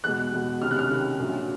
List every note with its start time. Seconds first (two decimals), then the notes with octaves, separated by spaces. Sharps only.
0.04 E2 B2 G#3 F#6
0.33 E2 B2 G#3
0.62 C#2 C3 D#3 F6
0.71 F#6
0.79 F6
0.90 C#2 C3 D#3
1.19 A#1 A#2 F#3